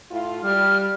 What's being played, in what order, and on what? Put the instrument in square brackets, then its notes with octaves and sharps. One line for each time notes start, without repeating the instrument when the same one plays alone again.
[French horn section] A2 E4 F4
[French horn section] G3 [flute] F6